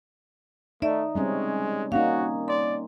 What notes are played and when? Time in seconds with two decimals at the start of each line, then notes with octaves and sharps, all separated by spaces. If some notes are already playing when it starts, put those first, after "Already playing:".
0.82 A3 D#4 D5 E5
1.15 G3 G#3 C4 C#4
1.92 A#3 C#4 D#4 F#4 F5
2.48 D5 C6